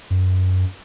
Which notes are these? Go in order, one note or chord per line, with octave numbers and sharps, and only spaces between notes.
F#2